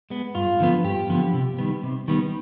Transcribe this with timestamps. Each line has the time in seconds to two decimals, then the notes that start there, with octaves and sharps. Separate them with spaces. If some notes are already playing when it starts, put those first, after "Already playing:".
0.10 G#3 B3
0.35 G2 F4
0.60 D3 F3 B3
0.84 G2 G4
1.10 D3 F3 B3
1.33 C3
1.59 D#3 G3 B3
1.83 C3
2.08 D#3 G3 B3